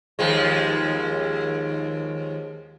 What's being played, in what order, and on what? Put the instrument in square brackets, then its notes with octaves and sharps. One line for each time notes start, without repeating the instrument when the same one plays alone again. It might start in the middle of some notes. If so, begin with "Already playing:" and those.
[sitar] D#2 F3 G#3